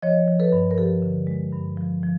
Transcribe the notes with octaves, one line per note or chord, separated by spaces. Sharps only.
F3 C#5 D#5
F3
A4 B4
G2
A#4
F3 G4 A4
D3
G#3
G2
F3
F3